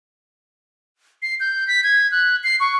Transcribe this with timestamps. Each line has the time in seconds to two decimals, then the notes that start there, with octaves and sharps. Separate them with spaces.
1.22 C7
1.40 G6
1.67 B6
1.83 G#6
2.11 F#6
2.44 C7
2.60 C#6